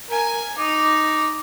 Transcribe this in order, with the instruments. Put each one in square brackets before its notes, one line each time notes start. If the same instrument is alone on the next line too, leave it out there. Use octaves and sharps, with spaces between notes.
[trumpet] A#4 [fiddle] G#5
[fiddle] D#4 [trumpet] D6